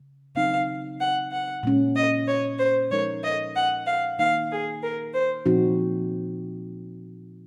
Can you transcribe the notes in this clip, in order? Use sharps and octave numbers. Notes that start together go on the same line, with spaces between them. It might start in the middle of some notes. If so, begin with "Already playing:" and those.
Already playing: C#3
C#3 F#3 C4 D#4 F5
F#5
F#5
A#2 G#3 C#4
D#5
C#5
C5
F3 G#3 D#4 A#4 C#5
D#5
F#5
F5
D#3 A#3 D#4 F5
G#4
A#4
C5
A#2 F3 C4 D#4 F#4